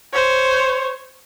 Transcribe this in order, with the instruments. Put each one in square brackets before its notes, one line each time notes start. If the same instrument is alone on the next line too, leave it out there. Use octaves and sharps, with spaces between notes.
[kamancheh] C5 C#5